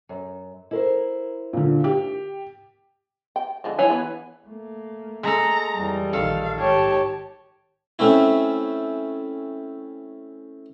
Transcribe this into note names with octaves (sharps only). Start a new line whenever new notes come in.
F#2
E4 A#4 C5
A#2 D3
G4
G5
D3 F3 G#3
E3 C#5 G#5
B3 B4
A3 A#3
G#3 A4 A#5
F2 E3 G3
A#1 D#3 A4 F5
G#2 D#3 G4 C#5 A5
A3 C4 C#4 E4